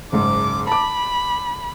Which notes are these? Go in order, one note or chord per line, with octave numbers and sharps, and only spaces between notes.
F#1 G#2 D6
A5 B5 D6